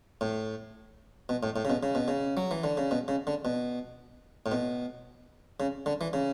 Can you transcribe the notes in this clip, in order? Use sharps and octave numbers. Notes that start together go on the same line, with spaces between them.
A2
B2
A2
A2
C#3
B2
C#3
B2
C#3
F#3
E3
D3
C#3
B2
C#3
D3
B2
A2
B2
C#3
D3
E3
C#3